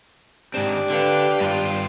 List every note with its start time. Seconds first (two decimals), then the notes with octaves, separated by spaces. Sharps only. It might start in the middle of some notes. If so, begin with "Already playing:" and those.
0.54 G#2 C4 D4 G4
0.90 D3 B4 F5 G5
1.41 G2 F4